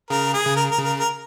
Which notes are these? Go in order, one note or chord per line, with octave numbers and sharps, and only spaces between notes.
C#3 A#4
G#4
C#3
A#4
A#4
C#3
A#4
A#4